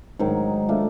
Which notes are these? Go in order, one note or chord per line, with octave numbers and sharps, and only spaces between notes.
G#2 D#3 F#3
A3 D4 F4